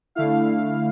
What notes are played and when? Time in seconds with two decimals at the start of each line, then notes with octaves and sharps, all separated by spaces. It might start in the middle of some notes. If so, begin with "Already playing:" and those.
0.15 D3 A3 E4 F5